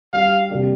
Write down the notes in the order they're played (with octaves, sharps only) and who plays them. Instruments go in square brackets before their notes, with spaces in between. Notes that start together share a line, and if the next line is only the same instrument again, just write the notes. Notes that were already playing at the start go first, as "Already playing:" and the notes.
[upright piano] G3 D4 G4 [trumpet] F5
[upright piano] C3 G3 A#3 D4 G4